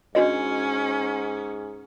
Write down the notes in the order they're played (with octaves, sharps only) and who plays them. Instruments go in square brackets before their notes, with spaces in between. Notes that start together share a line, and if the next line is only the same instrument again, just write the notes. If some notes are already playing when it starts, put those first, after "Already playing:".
[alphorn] G#2 [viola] C#4 [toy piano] D4 F#4 D#5